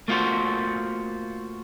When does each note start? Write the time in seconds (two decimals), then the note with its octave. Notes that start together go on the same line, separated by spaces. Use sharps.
0.08 A3 A#3 F4 F#4 C5